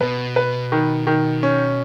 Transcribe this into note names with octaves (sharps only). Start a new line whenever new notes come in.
B2 B4
B4
D#3
D#3
C#4